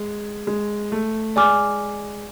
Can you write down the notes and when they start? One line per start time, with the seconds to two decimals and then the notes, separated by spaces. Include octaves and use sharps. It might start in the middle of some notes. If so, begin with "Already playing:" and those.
Already playing: G#3
0.47 G#3
0.92 A3
1.36 G#3 D5 G#5 D6 F6